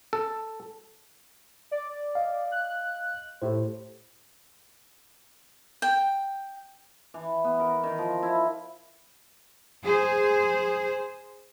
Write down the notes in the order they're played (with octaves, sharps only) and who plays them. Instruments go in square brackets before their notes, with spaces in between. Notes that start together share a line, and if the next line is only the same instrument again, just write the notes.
[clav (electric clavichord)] A4
[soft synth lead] D5
[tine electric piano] D#5 F5
[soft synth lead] F#6
[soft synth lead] A2 [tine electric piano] G4 C5
[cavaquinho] G5
[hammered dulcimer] E3
B3
A#4
D#3
F3
E4
[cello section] G#4 C5